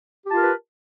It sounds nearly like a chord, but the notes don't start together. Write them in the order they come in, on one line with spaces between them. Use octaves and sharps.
G4 A5 F4 A#4 B4